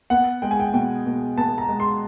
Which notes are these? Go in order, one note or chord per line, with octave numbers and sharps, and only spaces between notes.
B3 F#5
G#3 G5
G#5
G5
B2 G5
B2
B3 A5
A#5
G#3
C6